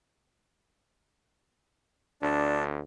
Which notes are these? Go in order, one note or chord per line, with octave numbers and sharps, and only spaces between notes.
D2 D4